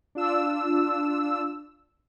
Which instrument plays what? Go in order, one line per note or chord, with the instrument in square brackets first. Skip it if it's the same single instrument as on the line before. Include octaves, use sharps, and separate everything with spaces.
[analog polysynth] D4 F4 E6